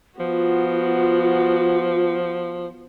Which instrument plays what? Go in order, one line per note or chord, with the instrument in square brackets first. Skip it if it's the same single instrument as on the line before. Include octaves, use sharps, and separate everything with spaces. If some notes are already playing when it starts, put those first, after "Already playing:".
[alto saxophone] F3 [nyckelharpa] B3 F#4 [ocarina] F4